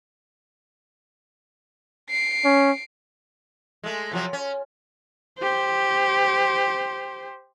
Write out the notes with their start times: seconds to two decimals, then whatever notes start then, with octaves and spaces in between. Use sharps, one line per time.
2.10 C7 D7
2.44 C#4
3.84 G#3 A3
4.12 C3 F3 F#3
4.33 C#4
5.39 G4 C5